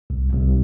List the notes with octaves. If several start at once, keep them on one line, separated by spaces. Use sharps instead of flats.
C2
C2